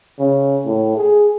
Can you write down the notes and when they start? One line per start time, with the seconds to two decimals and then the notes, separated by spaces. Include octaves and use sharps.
0.19 C#3
0.65 A2
0.97 G#4